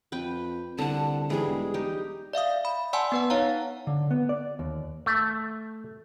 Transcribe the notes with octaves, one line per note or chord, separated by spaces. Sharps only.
F2 B4 G5
C2 D3 F#5 A5
G#2 E3 G3 G#3 G#4
E1
D#4 G4
D5 E5 F5 D#6
B5
D5 F#5 G#5 A5 C6 E6
B3 B4 F#5
D#4 C#5 F5 A#5
D3
B3
D5
D#2
A3